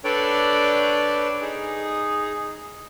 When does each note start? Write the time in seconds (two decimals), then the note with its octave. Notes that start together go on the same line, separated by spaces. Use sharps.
0.04 D4 A4 B4 C#5 D5 G5
1.41 D#4 G#4